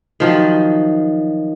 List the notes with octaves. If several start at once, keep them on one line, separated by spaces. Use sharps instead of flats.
D#3 F3 F#3